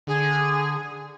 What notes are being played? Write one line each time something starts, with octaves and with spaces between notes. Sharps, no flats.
D3 G#4